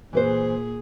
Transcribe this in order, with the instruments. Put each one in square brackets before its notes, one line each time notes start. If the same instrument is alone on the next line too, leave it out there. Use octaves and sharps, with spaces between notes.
[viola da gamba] A#2 G#4 [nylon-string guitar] E3 B4 C5